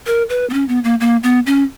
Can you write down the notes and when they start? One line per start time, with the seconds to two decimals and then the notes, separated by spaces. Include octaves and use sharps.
0.07 A#4
0.30 B4
0.50 B3
0.53 C#4
0.68 B3
0.84 A#3
1.00 A#3
1.23 B3
1.46 C#4